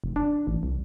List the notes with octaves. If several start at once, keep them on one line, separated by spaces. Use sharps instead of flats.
F1
D4
A1
C2